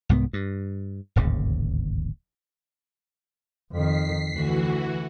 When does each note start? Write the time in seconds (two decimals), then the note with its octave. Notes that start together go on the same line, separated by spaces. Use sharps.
0.09 C2 G#2 A3 B3
0.33 G2
1.16 D1 G#1 D#2 C#3
3.72 F2 D#3 B6 C7
4.32 D2 E3 F#4